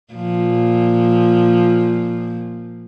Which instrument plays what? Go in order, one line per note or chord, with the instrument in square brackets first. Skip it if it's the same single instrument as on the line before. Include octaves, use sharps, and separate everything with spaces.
[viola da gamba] A#2 F3